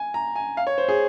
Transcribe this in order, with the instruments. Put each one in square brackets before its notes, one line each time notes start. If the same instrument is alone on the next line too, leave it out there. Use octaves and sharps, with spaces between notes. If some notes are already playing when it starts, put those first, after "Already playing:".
Already playing: [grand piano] G#5
A#5
G#5
F5
C#5
C5
G#4